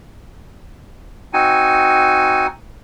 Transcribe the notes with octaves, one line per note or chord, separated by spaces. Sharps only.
C4 D#4 F#4 G#5